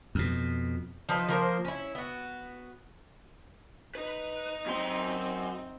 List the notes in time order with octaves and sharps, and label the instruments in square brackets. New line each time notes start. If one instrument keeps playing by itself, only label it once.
[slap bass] F2 B2
[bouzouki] F3 D#4 B4 E5
F3 A#3 A#4 C5
C#4 E4
B3 F#4
[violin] D#4 [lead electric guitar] B4
[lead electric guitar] F#2 C6 [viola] C4